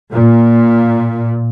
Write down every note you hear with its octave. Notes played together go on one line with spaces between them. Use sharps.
A#2